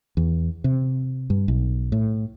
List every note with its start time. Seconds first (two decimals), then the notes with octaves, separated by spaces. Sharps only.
0.17 E2
0.64 C3
1.30 G2
1.48 B1
1.92 A2